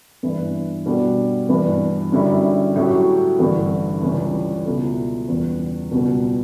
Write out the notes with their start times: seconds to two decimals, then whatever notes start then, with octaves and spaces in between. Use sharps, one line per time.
0.23 G2 E3 B3 E4
0.86 B2 G3 D4 F#4 A4
1.49 G2 E3 B3 D4
2.12 F#2 D3 G3 C#4 E4
2.76 A2 F#3 C#4 G4
3.39 A1 G2 D3
4.02 C#2 C#3 E3 G3 C#4
4.65 C#2 B2 A3 E4 A4
5.28 E2 C#3 G3
5.91 C#2 B2 G3